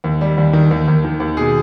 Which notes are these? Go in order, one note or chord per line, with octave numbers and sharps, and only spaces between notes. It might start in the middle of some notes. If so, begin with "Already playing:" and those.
D#2
G3
D#2
D#3
D#2
D#2
D#3
D#2
B2 G#4